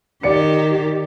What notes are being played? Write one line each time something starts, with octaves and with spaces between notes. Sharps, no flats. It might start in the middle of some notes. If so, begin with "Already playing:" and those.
D#3 G4 D5 C#7